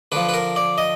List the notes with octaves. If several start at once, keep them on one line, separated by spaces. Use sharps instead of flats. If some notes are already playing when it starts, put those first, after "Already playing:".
D3 F3 B4
B4
A#4
D5
D#5